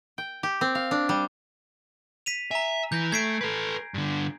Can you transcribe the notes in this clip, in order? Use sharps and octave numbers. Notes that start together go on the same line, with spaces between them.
G5
G4
C4
F5
D4
G3
B6 D#7 F7
E5 G#5 A#5
E3 G6 A#6
A3 G#6 C7 D7
A4 B4
G2 D3